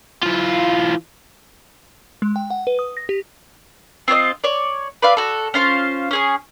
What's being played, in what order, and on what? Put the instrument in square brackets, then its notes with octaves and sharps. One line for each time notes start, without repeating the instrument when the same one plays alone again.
[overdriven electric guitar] E3 F4
[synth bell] G#3
G5
F#5
B4
D#6
A#6
G4
[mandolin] C4 F4 C#5 D#5
C#5 D5
B4 D5 E5 F5
F#4 A4
C#4 F4 C5 F5
C#4 G#4 D#6